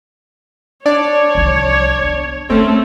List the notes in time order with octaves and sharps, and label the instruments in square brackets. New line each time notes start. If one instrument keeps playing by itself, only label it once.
[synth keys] D4 D5 A5 [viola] C#5
[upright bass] C2 F3
B3
[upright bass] G#3 [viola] A3 A4 [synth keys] C4 C#4